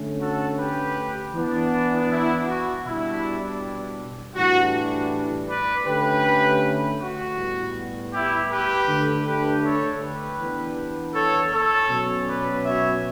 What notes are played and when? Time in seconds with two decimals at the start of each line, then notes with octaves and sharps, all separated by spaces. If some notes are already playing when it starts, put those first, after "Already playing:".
Already playing: D3 A3 C#4
0.21 F#4 A4
0.58 G4 B4
1.34 E3 B3 D4
2.09 E4
2.46 F#4
2.84 B2 G3 D4 E4
4.35 A2 E3 G3 D4 F#4
5.48 B4 D5
5.86 D3 A3 C#4 G4 B4
7.00 F#4
7.38 A2 G3 B3
8.13 E4 G4
8.50 G4 B4
8.88 D3 A3 D4
9.26 G4 B4
9.63 A4 C#5
10.01 G4 B4
10.39 E3 B3 D4
11.14 A4 C#5
11.52 A4 C#5
11.90 B2 F#3 C#4
12.27 B4 D5
12.65 C#5 E5